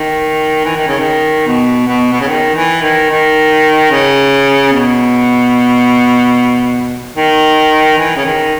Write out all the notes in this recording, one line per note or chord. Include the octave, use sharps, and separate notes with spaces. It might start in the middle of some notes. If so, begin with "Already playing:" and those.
Already playing: D#3
E3
D#3
C#3
D#3
B2
B2
B2
C#3
D#3
E3
D#3
D#3
C#3
B2
D#3
E3
C#3
D#3